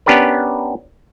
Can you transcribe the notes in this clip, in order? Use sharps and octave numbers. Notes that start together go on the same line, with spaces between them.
B3 C#4 D4 G4 A#4 B4